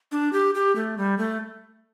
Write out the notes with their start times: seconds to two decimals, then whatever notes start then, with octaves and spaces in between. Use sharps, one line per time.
0.12 D4
0.33 G4
0.55 G4
0.76 A3
0.98 G3
1.18 A3